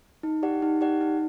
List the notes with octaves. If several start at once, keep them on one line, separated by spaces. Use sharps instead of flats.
D#4
G4 D5 F#5
D#4
G4 D5 F#5
D#4